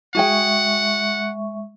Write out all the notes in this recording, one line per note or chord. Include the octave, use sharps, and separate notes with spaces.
G#3 F#4 G#4 E5 F#5 G5 C#6